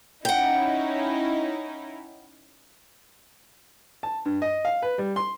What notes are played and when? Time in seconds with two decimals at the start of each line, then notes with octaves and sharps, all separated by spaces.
0.25 C#4 D#4 E4 F#5 G5
4.03 A5
4.25 G2
4.42 D#5
4.65 F5
4.82 B4
4.98 G3
5.16 C6